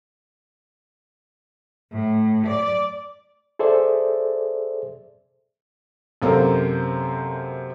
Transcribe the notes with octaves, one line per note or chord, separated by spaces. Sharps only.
A2
D5
G#4 A4 C5 D5 E5
F#2 C3 A#3 A4 A#4 C5